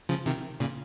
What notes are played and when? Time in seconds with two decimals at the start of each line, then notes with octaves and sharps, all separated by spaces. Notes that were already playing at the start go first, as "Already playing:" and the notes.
0.09 C#3 F3
0.26 C3 D#3
0.60 A#2 C#3